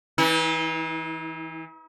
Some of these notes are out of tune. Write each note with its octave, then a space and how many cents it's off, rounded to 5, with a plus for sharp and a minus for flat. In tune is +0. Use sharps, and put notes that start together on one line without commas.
E3 -20 D#4 +45